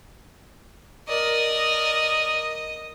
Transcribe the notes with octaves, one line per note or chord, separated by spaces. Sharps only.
A#4 D5 D#5